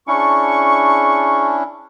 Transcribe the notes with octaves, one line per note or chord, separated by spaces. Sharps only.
C#4 D4 E4 G#4 A5 C#6